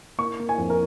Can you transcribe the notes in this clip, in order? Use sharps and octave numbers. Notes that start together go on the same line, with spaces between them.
A#3 C#6
A#3
G#5
F2
A#4